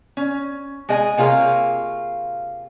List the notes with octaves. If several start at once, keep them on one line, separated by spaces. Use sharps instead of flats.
C#4
G#3 G#4 D#5 F5 G#5
C3 A#3 F4 G#4 C#5